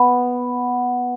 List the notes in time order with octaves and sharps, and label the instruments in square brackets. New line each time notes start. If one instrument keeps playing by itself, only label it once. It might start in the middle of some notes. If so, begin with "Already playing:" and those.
Already playing: [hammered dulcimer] B3